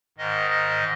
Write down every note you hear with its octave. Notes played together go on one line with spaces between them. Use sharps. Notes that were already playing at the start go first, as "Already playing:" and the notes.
G#2 D#3 D#5
D#5